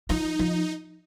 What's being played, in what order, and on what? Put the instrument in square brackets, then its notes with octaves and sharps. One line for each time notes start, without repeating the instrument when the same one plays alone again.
[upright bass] F3 [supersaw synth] D#4
[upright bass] F3